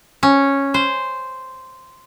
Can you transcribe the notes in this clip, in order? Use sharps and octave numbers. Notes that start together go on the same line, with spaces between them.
C#4
C5